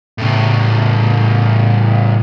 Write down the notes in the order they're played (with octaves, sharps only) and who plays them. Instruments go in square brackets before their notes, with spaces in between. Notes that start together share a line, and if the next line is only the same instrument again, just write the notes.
[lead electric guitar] A2 C#3